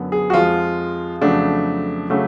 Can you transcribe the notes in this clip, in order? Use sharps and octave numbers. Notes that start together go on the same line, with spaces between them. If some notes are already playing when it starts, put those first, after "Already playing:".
Already playing: F#2 D3 F#3 B3
G#4
F#4
F2 F3 G#3 F4
F2 C#3 F#3 A3 D4
C#3 F#3 A3